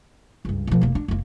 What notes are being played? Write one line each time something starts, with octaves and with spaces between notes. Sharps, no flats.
C#2 G2
B2 F3
F1 A#3
D4
F#1 A#3